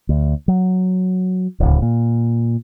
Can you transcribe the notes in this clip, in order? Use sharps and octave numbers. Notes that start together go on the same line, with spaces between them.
D2
F#3
D1 C#2
A#2